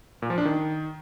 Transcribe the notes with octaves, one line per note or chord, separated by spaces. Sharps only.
A#2
F3
D4
D#3